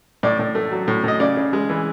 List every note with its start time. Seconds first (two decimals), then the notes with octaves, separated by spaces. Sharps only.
0.23 A2 D5
0.39 A2
0.55 A3
0.72 F#3
0.88 A2
1.04 A2 D#5
1.20 C#3 D5
1.37 C#3
1.53 G#3
1.69 E3